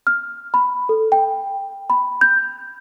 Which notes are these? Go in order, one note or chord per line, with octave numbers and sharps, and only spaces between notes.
F6
B5
A4
G5
B5
G6